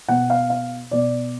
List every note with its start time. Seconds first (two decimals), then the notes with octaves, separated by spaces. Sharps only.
0.09 B2 F#5
0.30 F5
0.50 F5
0.91 B2 D5